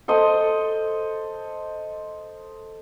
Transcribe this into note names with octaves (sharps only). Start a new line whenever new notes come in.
A4 C5 D#5 A5